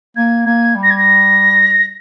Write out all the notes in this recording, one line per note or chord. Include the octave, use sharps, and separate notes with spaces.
A#3 G#6
A#3 G#6
G3
A#6
G#6
A#6